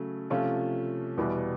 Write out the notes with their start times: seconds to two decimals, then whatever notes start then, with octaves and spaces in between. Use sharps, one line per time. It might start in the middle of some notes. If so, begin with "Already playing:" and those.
Already playing: C#3 F#3 A3
0.30 C3 F3 A3 C#4 F4
1.17 E2 B2 G3 B3 E4